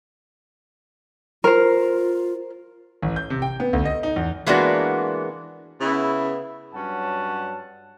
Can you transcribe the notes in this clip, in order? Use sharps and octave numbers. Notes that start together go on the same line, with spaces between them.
F4 A#4 C5
A1
G6
C3
G5
B3
D2
D#5
D#4
E2
E3 G#3 A#3 B3 D4 F#4
C#3 B3 E4
G2 F#3 C#4 F#5 A5